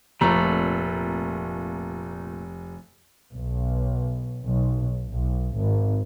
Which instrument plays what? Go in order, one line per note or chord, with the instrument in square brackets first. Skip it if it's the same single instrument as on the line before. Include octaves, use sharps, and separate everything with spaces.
[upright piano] F1 A#5 [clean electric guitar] A#2 A3
[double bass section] B1
B1
B1
G#1